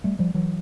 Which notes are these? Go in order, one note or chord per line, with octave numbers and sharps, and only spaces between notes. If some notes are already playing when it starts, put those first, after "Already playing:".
G3 A3
F3 G3
E3 F#3